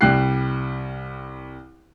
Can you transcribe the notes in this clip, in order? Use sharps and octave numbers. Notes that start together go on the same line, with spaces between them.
C2 G3 G5 F#6 C7